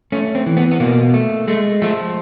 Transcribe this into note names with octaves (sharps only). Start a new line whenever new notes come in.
A3 C#4
C4
E3
B3
B3
B2 A#3
A3
G#3 A3
F3 A3